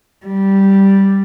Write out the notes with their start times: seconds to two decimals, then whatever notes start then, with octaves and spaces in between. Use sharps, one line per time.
0.26 G3